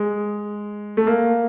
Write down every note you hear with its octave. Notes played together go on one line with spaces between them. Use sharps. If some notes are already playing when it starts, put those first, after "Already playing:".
Already playing: G#3
A3
A#3